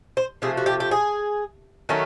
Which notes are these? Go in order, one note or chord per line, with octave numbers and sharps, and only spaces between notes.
C5
C3 F3 A3 G#4
F#4
G4
G4
G#4
D#3 F#3 A3 C#4